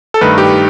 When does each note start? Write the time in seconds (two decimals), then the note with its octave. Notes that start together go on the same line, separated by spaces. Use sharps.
0.14 A4
0.21 G2 D#3 A3 D#4 B4
0.38 G4